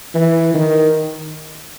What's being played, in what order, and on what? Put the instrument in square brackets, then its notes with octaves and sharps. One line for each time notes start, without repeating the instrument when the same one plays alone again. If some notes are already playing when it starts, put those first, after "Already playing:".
[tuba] E3
D#3